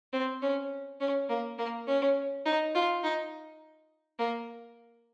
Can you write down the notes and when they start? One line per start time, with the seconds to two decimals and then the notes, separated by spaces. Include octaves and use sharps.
0.13 C4
0.42 C#4
1.00 C#4
1.29 A#3
1.58 A#3
1.87 C#4
2.46 D#4
2.75 F4
3.03 D#4
4.19 A#3